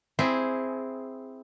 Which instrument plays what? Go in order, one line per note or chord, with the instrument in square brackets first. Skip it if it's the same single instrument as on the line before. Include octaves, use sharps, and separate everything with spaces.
[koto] C4 E4 G#4